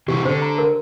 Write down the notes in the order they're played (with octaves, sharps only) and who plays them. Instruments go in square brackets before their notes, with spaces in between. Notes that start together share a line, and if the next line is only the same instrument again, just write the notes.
[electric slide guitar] C3 E3 [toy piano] G4
[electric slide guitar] D3 [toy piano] C5
[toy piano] A#5
A#4